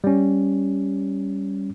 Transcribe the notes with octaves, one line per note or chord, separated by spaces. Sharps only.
G3 C#4